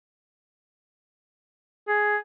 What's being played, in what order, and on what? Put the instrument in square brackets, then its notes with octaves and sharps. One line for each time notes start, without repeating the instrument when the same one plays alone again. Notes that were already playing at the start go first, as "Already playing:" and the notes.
[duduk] G#4